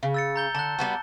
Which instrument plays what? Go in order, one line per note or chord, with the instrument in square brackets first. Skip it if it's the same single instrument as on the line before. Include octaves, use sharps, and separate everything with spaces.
[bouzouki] C#3
[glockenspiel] E6 A6 C#7
A#5 G6 G7
[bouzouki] D3 [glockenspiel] A5 F#6
[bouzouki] G3 B3 F#4 [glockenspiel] A5